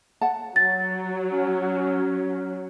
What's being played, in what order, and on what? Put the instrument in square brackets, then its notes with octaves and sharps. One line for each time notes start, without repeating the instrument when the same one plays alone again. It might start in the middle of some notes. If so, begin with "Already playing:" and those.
[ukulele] F#5 A5
[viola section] F#3 [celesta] A6
[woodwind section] C#4